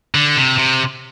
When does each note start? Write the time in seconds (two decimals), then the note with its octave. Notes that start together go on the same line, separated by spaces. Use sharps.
0.15 D3
0.37 C3
0.58 C3